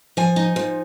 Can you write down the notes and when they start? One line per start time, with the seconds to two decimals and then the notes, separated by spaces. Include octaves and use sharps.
0.17 F3 G#5
0.36 D#4
0.56 F3